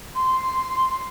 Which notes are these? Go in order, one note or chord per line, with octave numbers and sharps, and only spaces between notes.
C6